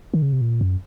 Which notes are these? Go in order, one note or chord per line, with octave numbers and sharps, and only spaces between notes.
D#3
C#3
C3
A#2
F#2